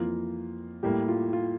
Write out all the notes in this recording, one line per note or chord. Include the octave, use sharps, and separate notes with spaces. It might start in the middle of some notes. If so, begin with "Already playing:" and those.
Already playing: F2 E3 A#3 F4
A2 G3 A#3 G4
F4
F4